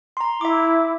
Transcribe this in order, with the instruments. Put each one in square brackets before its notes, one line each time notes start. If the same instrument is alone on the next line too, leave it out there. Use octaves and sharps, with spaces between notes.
[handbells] A#5 C6
[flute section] E4 [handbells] E5 D6